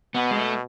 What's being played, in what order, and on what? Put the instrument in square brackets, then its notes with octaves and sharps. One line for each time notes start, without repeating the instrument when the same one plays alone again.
[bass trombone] B2 [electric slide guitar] B3
[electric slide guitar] G#3
A3